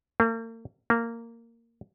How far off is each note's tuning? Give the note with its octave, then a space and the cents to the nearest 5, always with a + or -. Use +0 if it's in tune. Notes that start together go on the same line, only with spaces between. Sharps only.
A#3 -45
A#3 -15